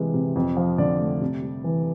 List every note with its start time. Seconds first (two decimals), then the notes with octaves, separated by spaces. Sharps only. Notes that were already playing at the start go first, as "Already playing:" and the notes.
Already playing: C3 E3 G#3
0.14 C3
0.36 F2
0.57 F3
0.78 D3 D5
1.00 A3
1.21 C3
1.43 G3
1.64 E3